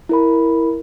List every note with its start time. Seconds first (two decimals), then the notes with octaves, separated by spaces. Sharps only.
0.09 E4 A#4 B5